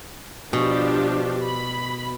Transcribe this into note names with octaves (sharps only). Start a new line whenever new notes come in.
B2 F3 D4 G4
B5